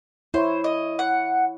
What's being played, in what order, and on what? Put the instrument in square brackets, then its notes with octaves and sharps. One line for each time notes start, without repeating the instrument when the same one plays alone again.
[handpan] E4 C#5 [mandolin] C5
[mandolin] D#5
F#5